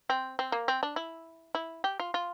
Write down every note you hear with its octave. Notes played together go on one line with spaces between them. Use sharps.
C4
C4
A#3
C4
D4
E4
E4
G4
F4
F4